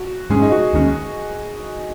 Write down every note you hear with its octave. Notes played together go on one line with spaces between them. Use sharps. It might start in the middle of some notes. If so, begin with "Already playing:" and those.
Already playing: F#4
G#2 G#3 C#4 G#4
D#4
F#4
D#2 D#3 G#3 C#4